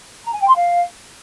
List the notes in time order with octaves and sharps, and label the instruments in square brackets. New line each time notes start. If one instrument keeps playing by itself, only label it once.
[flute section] A#5
G#5
G5
C6
F5